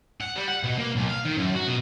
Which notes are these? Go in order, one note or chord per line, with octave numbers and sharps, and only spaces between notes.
F#5
G3
F#5
B2
A#3
B1
F5
D#3
F#2
F#4
B2